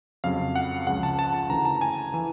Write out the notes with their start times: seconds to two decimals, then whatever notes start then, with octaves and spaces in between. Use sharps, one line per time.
0.24 F2 C#3 F#3 F5
0.56 F#5
0.87 C#2 C#3 F3 F#5
1.03 A5
1.19 A5
1.34 A5
1.49 D2 C#3 E3 A#5
1.65 A5
1.81 G#5
2.14 E3